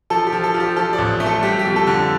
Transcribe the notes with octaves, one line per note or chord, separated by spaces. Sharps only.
F3 A4
G4
F3
A4
F3
G4
F3 A4
D5
A1
A3
A4
G3 G4
G4
F2
A4
D3